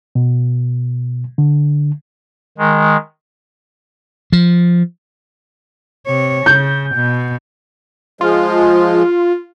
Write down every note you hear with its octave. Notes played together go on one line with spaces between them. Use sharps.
B2
D3
D#3 G#3
F3
C3 C#5
C#3 G6
B2
F3 G#3 F4